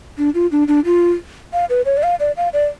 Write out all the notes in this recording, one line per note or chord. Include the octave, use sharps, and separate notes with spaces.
D4
F4
D4
D4
F4
F5
B4
C#5
D5
F5
D5
F5
D5